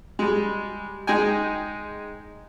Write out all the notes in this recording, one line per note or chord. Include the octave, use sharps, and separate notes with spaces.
G3 G#3
G#3 D#4 G5 G#5